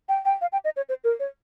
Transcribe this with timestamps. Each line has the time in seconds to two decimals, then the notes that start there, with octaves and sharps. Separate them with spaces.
0.09 G5
0.25 G5
0.41 F5
0.52 G5
0.64 D#5
0.76 C#5
0.89 C5
1.04 A#4
1.19 C#5